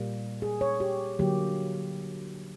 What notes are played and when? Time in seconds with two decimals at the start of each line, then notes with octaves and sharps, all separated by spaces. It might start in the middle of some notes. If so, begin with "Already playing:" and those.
Already playing: A#2 G3 A#3
0.42 G#4
0.61 C#5
0.80 G4
1.19 D3 F#3 A#3 G4